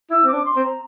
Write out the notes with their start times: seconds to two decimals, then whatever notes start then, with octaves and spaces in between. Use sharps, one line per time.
0.10 E4 E6
0.24 C4 D6
0.33 D4
0.45 C6
0.56 C4
0.63 A#5